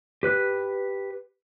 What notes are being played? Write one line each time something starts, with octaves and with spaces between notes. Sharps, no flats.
G4 B4 F#6